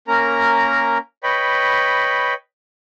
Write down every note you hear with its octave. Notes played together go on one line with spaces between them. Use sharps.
A#3 C#4 A#4 A#5
B4 C#5 D#5 G5 B5